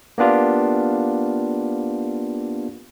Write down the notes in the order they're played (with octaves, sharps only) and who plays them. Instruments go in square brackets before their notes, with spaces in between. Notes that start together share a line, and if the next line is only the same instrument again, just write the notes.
[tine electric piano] A#3 B3 D4 F4 G4